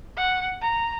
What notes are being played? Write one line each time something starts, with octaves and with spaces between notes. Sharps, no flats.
F#5
A#5